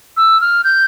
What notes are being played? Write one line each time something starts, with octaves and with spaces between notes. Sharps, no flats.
E6
F6
G6